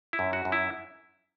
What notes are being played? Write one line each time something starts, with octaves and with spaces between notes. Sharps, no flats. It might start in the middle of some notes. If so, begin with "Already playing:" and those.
E4
F#2
F#4
F#2
E4